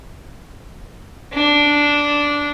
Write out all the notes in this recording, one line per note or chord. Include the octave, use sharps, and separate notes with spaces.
D4